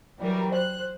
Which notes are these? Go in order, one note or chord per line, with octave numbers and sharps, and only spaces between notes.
E3 F#3 G3 A#4
C5 F#6